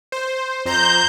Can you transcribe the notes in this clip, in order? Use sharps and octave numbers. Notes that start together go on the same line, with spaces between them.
C5
F2 C5 A#5 G6